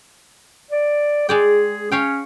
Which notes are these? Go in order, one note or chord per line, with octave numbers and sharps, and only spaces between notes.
D5
G#3 G#4 D5 G5
C#4 C#5 F5 G5